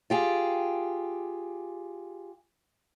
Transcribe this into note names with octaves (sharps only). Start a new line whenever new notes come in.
F4 G4 G#4